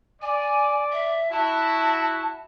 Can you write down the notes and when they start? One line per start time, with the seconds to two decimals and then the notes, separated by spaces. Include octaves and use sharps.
0.22 D5 G#5
0.92 E5
1.32 E4 F#4 A5